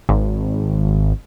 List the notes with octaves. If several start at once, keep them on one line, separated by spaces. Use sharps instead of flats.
G#1